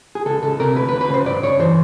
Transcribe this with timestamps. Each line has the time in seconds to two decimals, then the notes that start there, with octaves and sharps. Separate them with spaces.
0.15 G#4
0.26 C#2 A4
0.43 C#2 A4
0.59 C3 A#4
0.76 D2 B4
0.89 B4
0.93 D2
1.01 B4
1.10 C#3 C5
1.26 G2 D5
1.43 G2 C#5
1.60 E3 C5